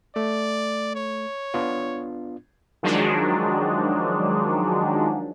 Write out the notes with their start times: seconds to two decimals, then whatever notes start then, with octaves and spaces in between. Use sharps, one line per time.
0.16 A3 D5
0.95 C#5
1.54 B3 D4 F4
2.83 D#3 F3 F#3 G#3 D4 D#4